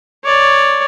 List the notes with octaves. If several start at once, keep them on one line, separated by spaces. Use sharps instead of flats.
C#5 D5